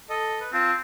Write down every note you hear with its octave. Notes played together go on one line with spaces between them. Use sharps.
A4 D#5
B4
C4 F4 A5